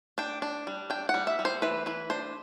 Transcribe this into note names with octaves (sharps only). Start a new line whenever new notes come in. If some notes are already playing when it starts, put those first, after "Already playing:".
D4 G5
D4
G3
D4 G5
F#5
G3
E5
G3
C5
E3 B4
E3 B4
D4 C5